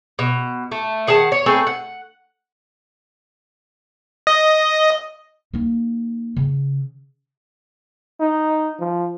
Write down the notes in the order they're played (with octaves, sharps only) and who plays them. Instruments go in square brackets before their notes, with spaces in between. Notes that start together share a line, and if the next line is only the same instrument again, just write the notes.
[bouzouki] B2
A3
D#3 G#4 F#5 A5
C#5
A3 C4 G#4 B4
F#5
[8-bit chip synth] D#5
[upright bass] A#3 D#4
C#3
[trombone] D#4
F3